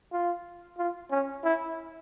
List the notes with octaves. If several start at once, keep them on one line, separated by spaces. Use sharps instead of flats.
F4
F4
C#4
E4